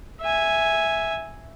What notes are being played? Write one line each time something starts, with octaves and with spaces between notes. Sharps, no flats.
E5 G#5